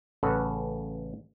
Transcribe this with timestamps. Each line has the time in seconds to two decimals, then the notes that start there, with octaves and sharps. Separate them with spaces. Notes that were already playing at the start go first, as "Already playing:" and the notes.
0.23 A1 C#3 A4 B4 F#5